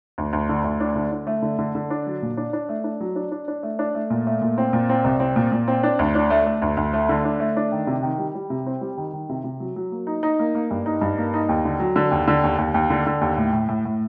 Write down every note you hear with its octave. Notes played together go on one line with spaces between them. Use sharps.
D2
D2
D3
D2
D4
D3
D4
A3
D3
D3
D3
D4
F#3
A#2
D4
D4
A3
D4
F#3
D4
D4
D4
A3
D4
A3
A#2
A3
A#2
C4
A#2
C4
C2
C4
A#2
A#2
C4
D4
D2
D4
A3
A3
D2
D2
A3
D3
D4
A3
D4
D#3
C3
D#3
G3
G3
C3
C4
G3
D#3
D#3
C3
C3
F#3
F#3
A#3
D#4
D#4
A#3
A#3
G2
D#4
G2
A#3
D#4
D#2
D3
F#3
D3
D#2
D3
D#2
D#2
D#2
D3
D3
D#2
A2
A2
A2
A2